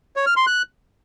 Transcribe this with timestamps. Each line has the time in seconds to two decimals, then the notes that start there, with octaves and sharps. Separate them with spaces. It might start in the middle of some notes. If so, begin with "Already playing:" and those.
0.16 C#5
0.26 F6
0.37 C6
0.47 F#6